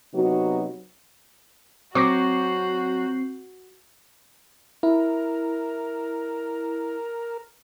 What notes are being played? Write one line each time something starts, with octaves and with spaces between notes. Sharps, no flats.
C3 F#3 B3 D#4 F#4
F#3 C4 F#4 C#6 D6 G6 A#6 C7
E4 A#4